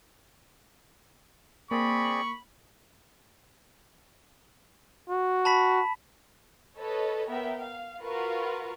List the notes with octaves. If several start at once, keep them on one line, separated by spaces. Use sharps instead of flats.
A#3 C4 G#4 D5 B5 C#6
F#4
A5 B5 B6
A4 B4 C#5 D#5 A5
B3 A#4 E5 G5
F5
F4 F#4 A#4 B4 F5 C#6